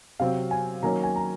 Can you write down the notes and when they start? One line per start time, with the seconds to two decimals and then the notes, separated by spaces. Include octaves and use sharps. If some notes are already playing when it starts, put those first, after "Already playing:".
0.20 C3 F#3 C4 F5
0.51 G#5
0.82 D#3 F#3 A#3 C#4 A#5
1.04 G#5
1.16 A#5